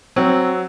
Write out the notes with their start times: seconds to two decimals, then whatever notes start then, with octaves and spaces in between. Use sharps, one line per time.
0.16 F#3 C4